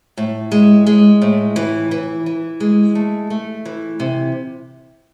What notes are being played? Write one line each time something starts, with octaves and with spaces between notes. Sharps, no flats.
A2
G#3
G#3
A2
E3
E3
E3
G#3
A3
A3
E3
C3